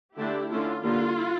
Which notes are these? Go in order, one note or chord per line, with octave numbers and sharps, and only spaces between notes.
D3 A3 D4 E4 G4
D3 A3 C#4 E4 F4
D3 G3 A#3 F4